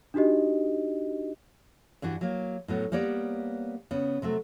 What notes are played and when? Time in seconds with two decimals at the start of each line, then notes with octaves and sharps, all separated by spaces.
0.14 D4 D#4 F#4 G4 D#5
2.02 G2 E3 D4 F#4
2.21 F#3 A#3
2.68 A2 F#3 B3
2.92 G3 A#3 B3 C#5 D5
3.91 C#3 B3
4.22 C3 F#3 A3